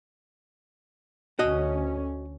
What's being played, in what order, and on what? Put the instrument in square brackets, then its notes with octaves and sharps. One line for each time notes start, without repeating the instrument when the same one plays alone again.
[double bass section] D2 C#4 [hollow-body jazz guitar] F#4 D#5